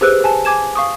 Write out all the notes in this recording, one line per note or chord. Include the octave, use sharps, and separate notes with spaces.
G4 G#4 B4 C5 E6 F#6
G#5 A5
G#5 D6 G#6 E7
F5 C#6 D#6